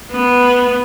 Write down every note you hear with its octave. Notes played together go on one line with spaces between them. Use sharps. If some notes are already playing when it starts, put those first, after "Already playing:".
B3